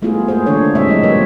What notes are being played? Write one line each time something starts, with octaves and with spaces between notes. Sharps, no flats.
G3 A3 B3 E4 F4 G#4
G#3 A#3 G#4 C5
D3 E3 D4 F4 A4 C#5
B2 G3 G#3 C4 E5
F#3 E4 D#5
G3 A#3 F4 B4 C#5